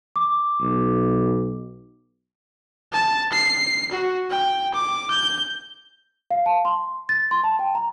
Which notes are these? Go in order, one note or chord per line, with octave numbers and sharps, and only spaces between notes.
D6
B1
A5
C7
F#4
G5
D6
G6
F5
A5
C6
A6
C6
A5
G5
A#5